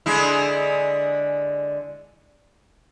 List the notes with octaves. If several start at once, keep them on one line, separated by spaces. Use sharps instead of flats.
D3 G#3 E4